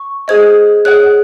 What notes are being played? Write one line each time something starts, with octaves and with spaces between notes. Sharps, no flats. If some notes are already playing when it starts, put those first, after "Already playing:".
Already playing: C#6
G#4 C5 D#5 G#6
G#4 C#5 F#5 F#6